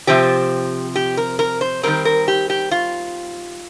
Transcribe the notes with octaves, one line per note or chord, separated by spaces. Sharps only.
C3 F3 C4 G4
G4
A#4
A#4
C5
D#3 G3 C4 A#4
A#4
G4
G4
F4